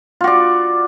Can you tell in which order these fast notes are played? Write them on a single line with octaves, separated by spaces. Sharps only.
F4 F#4 D5